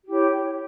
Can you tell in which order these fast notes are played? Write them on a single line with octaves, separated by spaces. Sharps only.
G4 E4 C#5